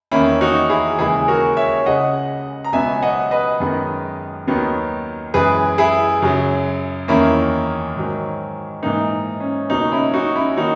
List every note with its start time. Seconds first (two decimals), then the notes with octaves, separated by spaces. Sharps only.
0.12 E2 D#3 A#3 C#4 E4
0.41 D#4 F#4
0.70 E4 G#4
0.99 D#2 C#3 E3 G#3 E4 G#4
1.28 F#4 A#4
1.57 C#5 E5
1.86 C#2 C#3 G#3 D#5 F#5
2.65 A#5
2.73 C#2 B2 F#3 B3 E5 G#5
3.03 D#5 F#5
3.31 B4 D#5
3.60 F#2 D#3 G#3 B3
4.47 D#2 D#3 F#3 B3
5.34 F#2 E3 G#3 G#4 B4
5.78 E4 G#4
6.22 F#2 C#3 F#3
7.08 E2 D#3 A#3 C#4 E4
7.96 G#2 D#3 F#3
8.83 G#2 E3 A#3 D#4
9.40 C#4
9.70 C#2 B2 F#3 A#3 D#4
9.92 C#4 E4
10.14 D#4 F#4
10.36 C#4 E4
10.57 D#3 A#3 D#4 F#4